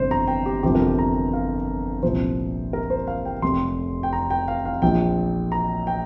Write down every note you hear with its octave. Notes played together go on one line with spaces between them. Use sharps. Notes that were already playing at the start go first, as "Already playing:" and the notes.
Already playing: G1 F2 C3 C5
A#5
G5
G4
G1 F2 C3 F3 G4
A#4
G4
A#5
F5
C2 A#2 F3 C5
A#4
C5
F5
G5
F1 F2 C3 C6
G5
A#5
G5
F5
F5
A#1 A#2 F3 G5
A#5
G5